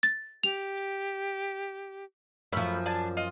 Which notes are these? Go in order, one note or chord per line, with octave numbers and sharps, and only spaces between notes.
A6
G4 F7
F#2 F3 A3 C#4 B5
D4 G#5 A5
F4 D#5